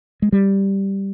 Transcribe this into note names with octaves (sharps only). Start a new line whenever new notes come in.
G#3
G3